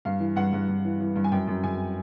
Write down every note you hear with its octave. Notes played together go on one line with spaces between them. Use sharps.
G2 F5
E3
G2 F#5
G2
G2
E3
E3
G2
G#5
F#2 G5
F#2
F#2 G#5